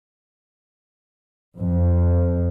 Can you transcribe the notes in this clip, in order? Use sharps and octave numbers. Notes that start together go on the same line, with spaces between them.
F2